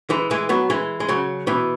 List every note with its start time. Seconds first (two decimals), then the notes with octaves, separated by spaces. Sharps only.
0.10 E3 G#3
0.31 E3 G#3
0.49 F#3 B3
0.70 E3 G#3
1.00 G#3
1.08 C#3 F#3
1.47 B2 E3